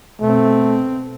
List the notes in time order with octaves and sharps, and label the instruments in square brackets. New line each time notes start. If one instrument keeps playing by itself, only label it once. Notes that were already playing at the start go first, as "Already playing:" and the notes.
[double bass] B2 C4 [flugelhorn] A3